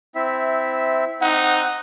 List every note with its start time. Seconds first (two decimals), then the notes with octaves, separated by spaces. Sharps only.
0.15 C4 E4 E5
1.21 C4 D#4 F#5